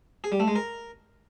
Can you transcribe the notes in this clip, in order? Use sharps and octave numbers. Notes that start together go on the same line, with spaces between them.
G#4
G3
A3
G#3
A#4